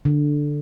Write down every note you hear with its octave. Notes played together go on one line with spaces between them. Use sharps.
D3